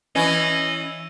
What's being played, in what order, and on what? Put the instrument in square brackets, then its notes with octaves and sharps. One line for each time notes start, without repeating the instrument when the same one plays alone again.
[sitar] E3 C#4 [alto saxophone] D#5